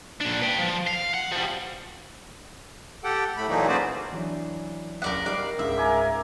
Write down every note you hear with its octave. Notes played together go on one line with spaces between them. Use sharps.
A#2 D4
B4 G5
F3
F5
F#5
F3 G3
G4 A4 F#5 G5
A2 A3 B5
A#2 E3 F#3 A3 A#3 D#4
C#4 F#4 G#4 B4 C5 D5
E3 F#3 D4
F#1 A#4 D5 F#5 B6
D#3 G3 D5 F5
C#2 G#2 E5
A#4 G#5 D6